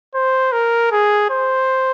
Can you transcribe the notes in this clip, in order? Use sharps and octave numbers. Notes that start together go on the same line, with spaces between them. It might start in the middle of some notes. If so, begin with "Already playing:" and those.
C5
A#4
G#4
C5